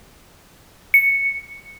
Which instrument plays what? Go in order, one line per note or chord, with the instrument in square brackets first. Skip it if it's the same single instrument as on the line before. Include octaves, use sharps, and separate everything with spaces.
[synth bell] C#7